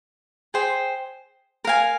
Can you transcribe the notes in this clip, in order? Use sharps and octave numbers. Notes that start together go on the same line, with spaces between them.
G#4 C5 G5
A#4 F5 G#5